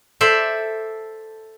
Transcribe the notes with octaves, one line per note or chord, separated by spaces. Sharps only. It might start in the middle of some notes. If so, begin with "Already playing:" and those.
A4 C5 D5 E5